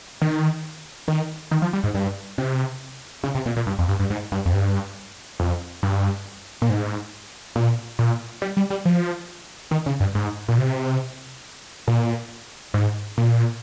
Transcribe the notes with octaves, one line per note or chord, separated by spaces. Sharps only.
D#3
D#3
D#3
F3
G3
G#2
G2
C3
C#3
C3
A#2
A#2
G2
F2
G2
G2
G#2
G2
F2
G2
F2
G2
A#2
G#2
A#2
A#2
G3
G3
G3
F3
D#3
C#3
G2
G#2
A#2
C3
A#2
G#2
A#2